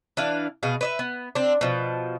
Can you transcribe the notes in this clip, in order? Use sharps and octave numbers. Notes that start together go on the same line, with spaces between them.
E3 D4 F5
B2 G#4 F5
B4 D#5 E5
B3
C4 D4
B2 F3